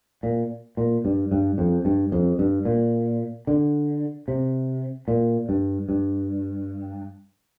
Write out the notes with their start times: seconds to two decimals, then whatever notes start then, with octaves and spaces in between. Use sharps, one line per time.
0.23 A#2
0.77 A#2
1.05 G2
1.32 G2
1.58 F2
1.85 G2
2.12 F2
2.39 G2
2.65 A#2
3.47 D3
4.28 C3
5.08 A#2
5.49 G2
5.89 G2